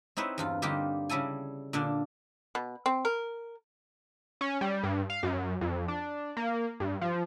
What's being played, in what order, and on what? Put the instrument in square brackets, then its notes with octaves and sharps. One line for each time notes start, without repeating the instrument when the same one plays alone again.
[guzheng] C4 D#4 E4 B4 C#5
E2 G2 F4
D3 G3 A#3 D#4 F4 G4
C#3 G3 E4 A4 G#5
A#2 D3 D4 F5
[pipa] B2
C4
A#4
[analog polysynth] C#4
G3
G2
F5
F#2
F2
D4
A#3
G2
F3